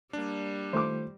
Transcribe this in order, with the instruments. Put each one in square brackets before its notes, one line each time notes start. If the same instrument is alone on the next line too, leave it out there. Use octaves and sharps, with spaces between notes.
[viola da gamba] G3 [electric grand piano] A#3 D4
[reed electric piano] D#3 A3 F4 [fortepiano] C5 D6